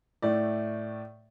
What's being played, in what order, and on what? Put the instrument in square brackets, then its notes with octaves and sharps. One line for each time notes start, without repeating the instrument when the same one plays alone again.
[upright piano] A2 A3 D5